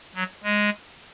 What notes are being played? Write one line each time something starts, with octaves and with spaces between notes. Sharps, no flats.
F#3
G#3